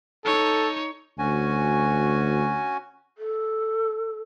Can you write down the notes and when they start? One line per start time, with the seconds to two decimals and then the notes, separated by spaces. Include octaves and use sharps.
0.24 D#4 A4 C#5
1.19 D2 C#4 F#4 G#5
3.18 A4